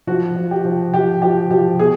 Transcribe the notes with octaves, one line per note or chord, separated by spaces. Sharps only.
F3 F#4
F3
G4
F3
F3 G4
F3 G4
F3 G4
B2 G#4